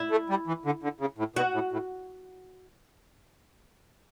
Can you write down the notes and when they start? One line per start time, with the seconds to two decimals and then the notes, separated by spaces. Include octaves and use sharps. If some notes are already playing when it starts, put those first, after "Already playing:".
Already playing: E4
0.11 A3
0.30 G3
0.47 E3
0.65 D3
0.83 D3
1.00 C#3
1.18 A2
1.36 B2 F#4
1.54 A2
1.72 A2